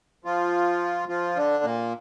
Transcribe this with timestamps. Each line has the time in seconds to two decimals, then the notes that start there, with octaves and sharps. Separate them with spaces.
0.25 F3 F4
1.09 F3 F4
1.35 D3 D4
1.64 A#2 A#3